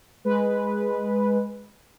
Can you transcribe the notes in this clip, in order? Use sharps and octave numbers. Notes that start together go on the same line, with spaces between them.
G#3 B4